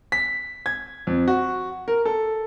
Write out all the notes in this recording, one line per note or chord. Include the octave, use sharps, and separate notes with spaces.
B6
G#6
F2
F#4
A#4
A4